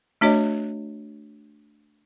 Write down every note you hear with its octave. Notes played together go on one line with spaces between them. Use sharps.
A3 D4 F#4 C#5 D#5